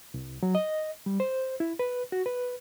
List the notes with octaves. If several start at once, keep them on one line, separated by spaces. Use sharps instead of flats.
C2
F#3
D#5
G3
C5
E4
B4
F#4
B4